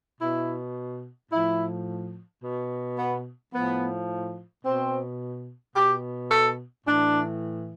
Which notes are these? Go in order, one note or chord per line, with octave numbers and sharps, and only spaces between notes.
B2 E4
A2 F3 E4
B2
B3
A2 F3 B3
B2 C4
B2 G4
A4
A2 E3 D4